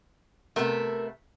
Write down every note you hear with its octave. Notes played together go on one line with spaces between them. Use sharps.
C3 A3 B3 A#4 E5